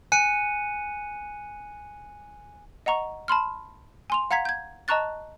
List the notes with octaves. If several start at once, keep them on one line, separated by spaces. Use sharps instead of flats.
G#5 F#6 C#7 D#7
D#5 F#5 A#5 C#6
A5 B5 C6 F6
G#5 C6 F7
F5 F#5 A#5 G#6 B6
G6 G#6
D#5 A5 A#5 C#6 F#6 A6